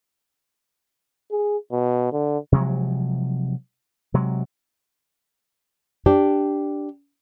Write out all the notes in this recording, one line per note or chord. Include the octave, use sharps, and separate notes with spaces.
G#4
B2
D3
C3 F3 F#3 G#3
C3 F#3 G#3
D4 G4